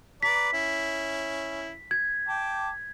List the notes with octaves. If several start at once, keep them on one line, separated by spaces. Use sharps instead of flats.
B4 D5 A#5 B6
C#4 E4
G#6
G5 A5 D6